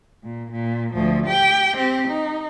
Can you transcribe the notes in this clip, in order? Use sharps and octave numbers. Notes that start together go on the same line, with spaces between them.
A#2
A#2
D2 F3
G4 G5
C4 G4
D#4